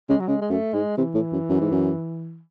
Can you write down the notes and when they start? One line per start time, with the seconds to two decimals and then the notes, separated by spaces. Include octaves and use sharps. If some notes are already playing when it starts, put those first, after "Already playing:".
0.09 C#3 G#3
0.20 F#3
0.28 C#3 G#3
0.41 G#3
0.50 F#2 A3
0.74 G#2 G#3
0.98 C3 E3
1.15 A2
1.33 F#2
1.49 F#2
1.61 G#2
1.72 F#2